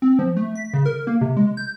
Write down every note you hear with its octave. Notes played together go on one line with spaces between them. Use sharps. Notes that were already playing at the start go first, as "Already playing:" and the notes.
C4
F3
A3
B6
C#3
A#4
A#3
C3
G#3
G6